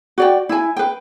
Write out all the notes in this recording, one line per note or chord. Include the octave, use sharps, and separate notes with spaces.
F#4 D5 G5
E4 G#5
B4 G5